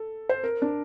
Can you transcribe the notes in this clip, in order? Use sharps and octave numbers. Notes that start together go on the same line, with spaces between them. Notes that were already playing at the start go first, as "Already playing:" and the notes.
Already playing: A4
C5
A#4
D4